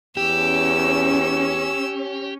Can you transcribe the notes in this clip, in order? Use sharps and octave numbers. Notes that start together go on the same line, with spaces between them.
E2 C#4 G4 E6